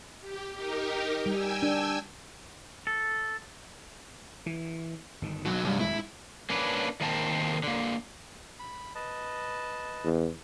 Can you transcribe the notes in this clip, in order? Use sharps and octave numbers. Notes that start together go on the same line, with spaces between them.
G4
D#4 G4 A#4
G3 G5 G#5 E6
D4
A4
E3
G1 D#3
B1 F#3
C2 G2 F#3
D1 G#1 G#3 E4
A#3 C#4 D4 B4
D#3 A#3 C4 A5
D3 A#3
B5
B4 D#5 A5
E2